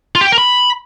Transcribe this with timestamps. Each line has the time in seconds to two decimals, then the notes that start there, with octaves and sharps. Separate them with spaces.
0.15 F4
0.21 G4
0.27 G5
0.32 A#4
0.38 B5